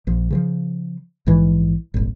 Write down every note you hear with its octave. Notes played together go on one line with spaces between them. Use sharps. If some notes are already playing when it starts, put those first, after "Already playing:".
A#1 F3
C#3 E3 F3
A#1 G#2 E3 G#3
D#1 G#1